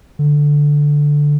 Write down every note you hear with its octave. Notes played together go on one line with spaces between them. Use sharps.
D3